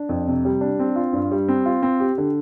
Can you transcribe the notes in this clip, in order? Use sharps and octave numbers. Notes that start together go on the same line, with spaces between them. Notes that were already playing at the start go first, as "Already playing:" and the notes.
Already playing: D4
F2
C3
G3
D4
C4
F4
G2
G3
C4
F4
C4
G4
D3